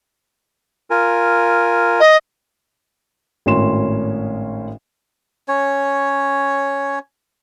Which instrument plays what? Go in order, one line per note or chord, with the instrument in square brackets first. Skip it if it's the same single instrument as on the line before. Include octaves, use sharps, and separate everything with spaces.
[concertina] F4 A#4 G#5
[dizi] D#5
[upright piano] G#1 A2 C#4 A#4 C6 E7
[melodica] C#4 C#5